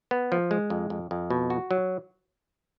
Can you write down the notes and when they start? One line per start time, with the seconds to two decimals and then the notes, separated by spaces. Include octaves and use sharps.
0.11 B3
0.32 F3
0.51 G#3
0.70 F2
0.90 F2
1.11 F2
1.30 B2
1.50 F#4
1.71 F#3